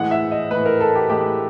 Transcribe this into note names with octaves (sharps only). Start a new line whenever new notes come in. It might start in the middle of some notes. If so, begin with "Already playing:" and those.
Already playing: A2 E3 G#3 F#5
E5
D#5
A2 E3 G#3 B4
A#4
A4
G4
A2 E3 G#3 G4